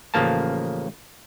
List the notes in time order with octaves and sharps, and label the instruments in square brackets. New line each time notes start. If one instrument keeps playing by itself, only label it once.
[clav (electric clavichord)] A1 C#3 F3 A#3 A5